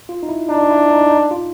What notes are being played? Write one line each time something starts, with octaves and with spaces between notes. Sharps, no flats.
F4
D#4
E4
D4 D#4
E4
D#4
D#4
F4